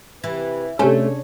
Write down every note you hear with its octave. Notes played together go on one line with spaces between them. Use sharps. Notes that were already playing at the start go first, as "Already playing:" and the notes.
C3 E3 G4 B4
C3 A3 C#4 D4 G#4 A4 C5 C#5